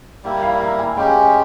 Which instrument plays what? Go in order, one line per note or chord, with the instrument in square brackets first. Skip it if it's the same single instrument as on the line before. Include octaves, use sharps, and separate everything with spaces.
[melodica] G3 A#3 E4 [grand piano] G5
[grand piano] F5
A#5
G#5
[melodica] G#3 C#4 G4 [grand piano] G5